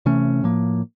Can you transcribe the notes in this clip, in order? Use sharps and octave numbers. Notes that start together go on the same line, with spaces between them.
C3 E3 A3 C#4
A2 F3 A#3